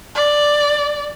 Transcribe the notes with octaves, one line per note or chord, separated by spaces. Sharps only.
D5